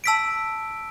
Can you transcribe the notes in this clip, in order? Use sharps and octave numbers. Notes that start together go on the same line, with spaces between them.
A5 E6 B6 D7